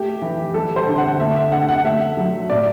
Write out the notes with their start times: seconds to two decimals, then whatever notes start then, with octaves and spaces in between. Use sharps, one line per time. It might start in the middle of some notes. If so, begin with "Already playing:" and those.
Already playing: A3 G4
0.22 E3
0.54 G3 A4
0.76 C5
0.87 D3
0.98 F#5
1.19 A3 E5
1.36 E5
1.52 D3 F#5
1.69 F#5
1.84 A3 E5
2.17 F#3
2.50 A2 D5